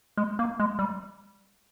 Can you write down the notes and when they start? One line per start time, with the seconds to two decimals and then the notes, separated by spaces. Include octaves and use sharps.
0.17 G#3
0.39 A#3
0.60 G#3
0.79 G3